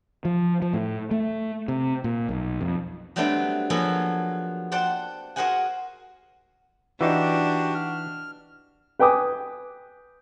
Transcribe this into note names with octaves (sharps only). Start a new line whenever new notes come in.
F3
F3
A2
A3
C3
A#2
B1
F2
F#3 G3 A3 B3 C4 D4
F3 F#3 A#3 B3 G#4 A4
C5 D5 F#5 G5 A5
F#4 G#4 A#4 C5 F#5 G#5
E3 D4 D#4 F#4 G4
F6
B4 G5 G#5 D6 D#6